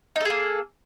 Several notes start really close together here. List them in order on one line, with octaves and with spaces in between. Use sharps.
D#4 A4 G#4 A#3